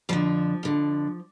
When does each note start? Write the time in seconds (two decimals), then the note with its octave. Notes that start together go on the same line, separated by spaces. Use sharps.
0.09 F2 D3 F3
0.63 F2 D3